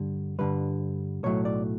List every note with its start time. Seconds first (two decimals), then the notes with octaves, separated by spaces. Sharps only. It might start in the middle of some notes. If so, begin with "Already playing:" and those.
Already playing: G2 D3 G3
0.39 G2 D3 G3 B4
1.23 B1 A2 F#3 A3 C#5
1.45 D5